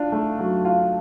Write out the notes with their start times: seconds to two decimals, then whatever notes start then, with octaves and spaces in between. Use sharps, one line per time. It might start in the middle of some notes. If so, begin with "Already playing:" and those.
Already playing: D4 F4
0.12 A3
0.39 F#3
0.65 F4